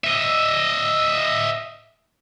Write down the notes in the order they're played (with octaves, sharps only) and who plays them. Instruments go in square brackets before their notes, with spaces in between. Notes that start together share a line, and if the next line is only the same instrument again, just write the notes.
[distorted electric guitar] D#5 E5